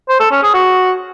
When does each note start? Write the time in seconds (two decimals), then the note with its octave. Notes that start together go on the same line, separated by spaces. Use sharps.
0.09 C5
0.20 A4
0.31 C#4
0.43 G#4
0.54 F#4